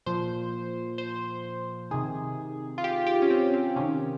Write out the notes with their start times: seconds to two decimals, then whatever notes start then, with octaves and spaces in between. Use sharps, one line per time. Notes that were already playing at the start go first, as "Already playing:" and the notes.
0.06 A#2 F3 C5
0.98 C5
1.91 C3 D#3 G#4
2.78 F4
2.84 G4
3.07 G4
3.22 C#4
3.30 C4
3.54 C4
3.76 C3 D#3 C#4